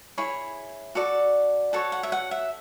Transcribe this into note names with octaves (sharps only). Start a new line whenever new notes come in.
E4 G#4 C#5 B5
F#4 A4 D5
F#4 A4 C#5 A5
F#5
E5
F#5
E5